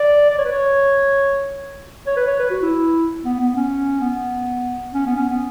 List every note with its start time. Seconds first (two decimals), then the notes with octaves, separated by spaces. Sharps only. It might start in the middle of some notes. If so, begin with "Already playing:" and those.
Already playing: D5
0.31 D5
0.38 C#5
0.45 B4
0.51 C#5
2.07 C#5
2.16 B4
2.27 C#5
2.39 B4
2.50 F#4
2.62 E4
3.25 B3
3.40 B3
3.56 C#4
4.01 B3
4.94 C#4
5.06 B3
5.17 C#4
5.30 B3